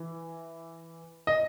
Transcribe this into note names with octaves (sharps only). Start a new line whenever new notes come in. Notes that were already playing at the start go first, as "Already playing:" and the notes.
Already playing: E3
D#5